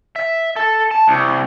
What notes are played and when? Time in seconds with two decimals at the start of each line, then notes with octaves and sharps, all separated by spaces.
0.16 E5
0.56 A4
0.91 A5
1.08 C2